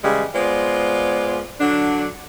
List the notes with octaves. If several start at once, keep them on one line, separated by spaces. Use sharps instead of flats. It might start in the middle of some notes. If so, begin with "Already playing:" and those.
C#3 E3 G3 G#3
G#3 B3 F4 C5 D5
D3 F#3 D4